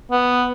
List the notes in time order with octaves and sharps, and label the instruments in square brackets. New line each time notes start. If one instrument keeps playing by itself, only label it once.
[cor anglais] B3